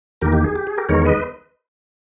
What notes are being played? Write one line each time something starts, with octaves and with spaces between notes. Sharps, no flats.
E2 D#3 A#3 G4 A#4
G4
G#4
G4
G#4
G4 A#4
E2 D#3 G#3 B3 A#4 C#5
B4 D#5